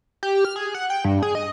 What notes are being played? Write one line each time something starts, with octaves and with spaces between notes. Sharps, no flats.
G4
F6
G#4
F#5
G5
G2
G#4
D#5